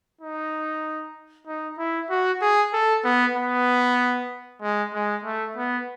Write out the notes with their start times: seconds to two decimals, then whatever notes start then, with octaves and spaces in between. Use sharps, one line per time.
0.21 D#4
1.47 D#4
1.78 E4
2.10 F#4
2.41 G#4
2.73 A4
3.04 B3
3.36 B3
4.62 G#3
4.94 G#3
5.25 A3
5.57 B3